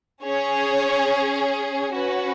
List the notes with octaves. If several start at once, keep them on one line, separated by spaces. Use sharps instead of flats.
C#4 G#4 C#5
C#4 F#4 B4